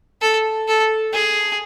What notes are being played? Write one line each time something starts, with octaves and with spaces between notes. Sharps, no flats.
A4
A4
G#4